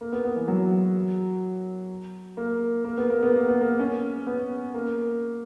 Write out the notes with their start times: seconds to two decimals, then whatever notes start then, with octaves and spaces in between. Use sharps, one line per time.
0.01 A#3
0.12 B3
0.24 B3
0.36 E3
0.48 F#3
2.37 A#3
2.85 A#3
2.98 B3
3.10 A#3
3.23 B3
3.36 A#3
3.49 B3
3.61 A#3
3.79 C#4
4.27 B3
4.74 A#3